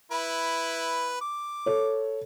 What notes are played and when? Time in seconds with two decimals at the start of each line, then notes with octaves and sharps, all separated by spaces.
0.12 E4 B4
1.21 D6
1.66 A4 C#5